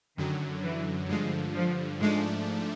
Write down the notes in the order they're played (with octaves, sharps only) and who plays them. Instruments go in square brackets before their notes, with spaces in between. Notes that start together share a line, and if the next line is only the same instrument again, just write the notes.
[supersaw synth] F#2 D3 F#3 [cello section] D#3
[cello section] E3
[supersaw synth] G2 D3 F3 [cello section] G#3
[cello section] F3
[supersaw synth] G#2 F3 A3 D4 [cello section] G#3